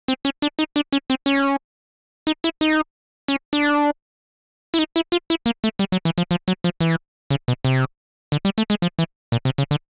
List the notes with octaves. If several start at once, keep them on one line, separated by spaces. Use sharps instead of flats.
C4
C#4
D4
D#4
D4
C#4
C4
C#4
D#4
E4
D#4
C#4
D4
E4
D#4
E4
F4
E4
A#3
A3
G3
F#3
E3
F3
F3
F#3
F3
E3
C#3
B2
C3
D3
G3
A3
G#3
F3
E3
A#2
C3
C#3
D3